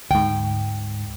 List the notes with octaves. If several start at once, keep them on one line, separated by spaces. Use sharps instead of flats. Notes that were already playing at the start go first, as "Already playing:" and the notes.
D2 G#2 G5